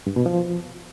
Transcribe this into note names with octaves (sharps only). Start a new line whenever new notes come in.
G2
B2
F3